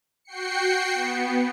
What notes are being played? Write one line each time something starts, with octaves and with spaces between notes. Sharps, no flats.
F#4 G5 C7 C#7
B3